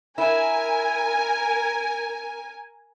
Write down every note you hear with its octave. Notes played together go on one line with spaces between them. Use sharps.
E4 A#4 G#5